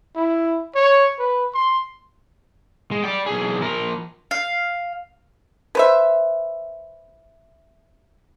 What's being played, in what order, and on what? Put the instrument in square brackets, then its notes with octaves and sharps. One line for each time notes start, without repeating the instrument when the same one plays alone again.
[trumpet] E4
C#5
B4
C6
[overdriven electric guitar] G#3
D5 G5
B1 G#4
F3 A#4
[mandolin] F5
[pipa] B4 C5 E5